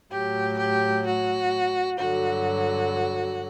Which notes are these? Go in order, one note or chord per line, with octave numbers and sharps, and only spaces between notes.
A2 F#3 G4
G4
F#4
G2 D3 F#3 F#4